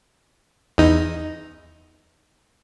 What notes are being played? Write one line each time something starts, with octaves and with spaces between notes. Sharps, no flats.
E2 D#4